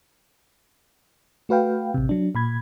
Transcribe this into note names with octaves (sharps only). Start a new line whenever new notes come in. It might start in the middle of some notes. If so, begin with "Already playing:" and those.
A3 F#4 B4 F5 G5
A1 C3
F#3 D4
A#2 B5 G#6